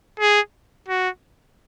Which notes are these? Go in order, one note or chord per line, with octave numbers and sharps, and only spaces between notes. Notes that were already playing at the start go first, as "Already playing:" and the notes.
G#4
F#4